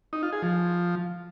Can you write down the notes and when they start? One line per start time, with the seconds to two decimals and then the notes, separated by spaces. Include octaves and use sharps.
0.13 D#4
0.23 F4
0.33 G#4
0.43 F3